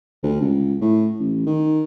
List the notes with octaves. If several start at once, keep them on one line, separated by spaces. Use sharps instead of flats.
D2
C#2
A2
A1
D#3